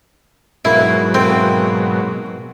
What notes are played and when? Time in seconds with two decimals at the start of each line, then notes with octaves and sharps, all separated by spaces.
0.65 G#2 B2 F#3 A#3 E4
1.14 A#3 C4